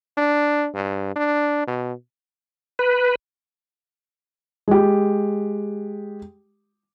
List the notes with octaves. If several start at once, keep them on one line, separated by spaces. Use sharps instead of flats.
D4
G2
D4
B2
B4
G#3 G4